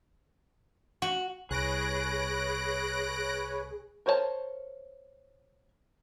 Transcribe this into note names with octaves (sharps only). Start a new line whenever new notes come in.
F#4
C2 G#4 B4 C#5 F#6 A#6 D7
A#4 C5 C#5 E5 A5